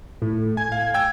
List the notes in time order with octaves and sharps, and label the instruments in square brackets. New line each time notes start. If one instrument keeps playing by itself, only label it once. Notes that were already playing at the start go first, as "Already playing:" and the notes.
[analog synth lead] A2
[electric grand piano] G#5 [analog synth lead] G#6
[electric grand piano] F5
G5 E6 G#6